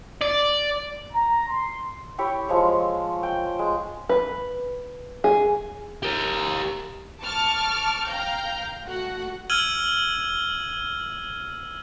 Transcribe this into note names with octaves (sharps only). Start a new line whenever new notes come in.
D5
A#5
C6
E4 G4 C#5 G5
F3 G#3 C#5
G5
G#3
B4
G#4
G4 A#4
A5 C#6 D6 F6
F5 G5 A#5 F6 G6
A3 F#4 F#5
E6 F6 G#6 D#7 F#7 G7